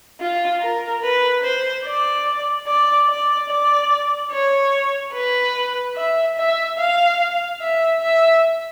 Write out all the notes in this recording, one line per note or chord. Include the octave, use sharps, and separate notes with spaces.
F4
A#4
B4
C5
D5
D5
D5
D5
C#5
B4
E5
E5
F5
E5
E5